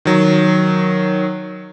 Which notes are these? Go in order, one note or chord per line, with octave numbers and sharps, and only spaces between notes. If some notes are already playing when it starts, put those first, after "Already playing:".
D#3 F#3